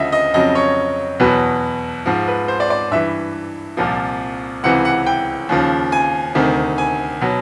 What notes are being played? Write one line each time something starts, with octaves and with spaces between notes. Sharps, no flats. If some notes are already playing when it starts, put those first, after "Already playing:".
Already playing: D2 C#3 F3 D#5 E5
D#5
F2 C#3 F#3 D#5
C#5
E2 B2 F#3 B4
G#2 F3
B4
C5
D5
D5
G2 E3 E5
C2 A#2 F3
C#2 C3 E3 F#5
F#5
G5
D#2 C#3 F3
G#5
D2 C3 D#3
G#5
B2 F#3